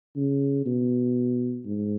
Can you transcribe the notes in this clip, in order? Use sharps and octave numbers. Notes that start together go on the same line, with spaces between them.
C#3
B2
G#2